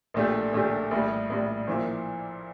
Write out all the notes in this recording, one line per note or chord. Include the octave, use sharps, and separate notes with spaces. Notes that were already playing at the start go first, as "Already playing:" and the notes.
A#1 A#2 A3 D4 G4
A#1 A#2 A3 D4 G4
A#1 A2 G3
A#1 A2 G3
A#2 F3 A#3 E4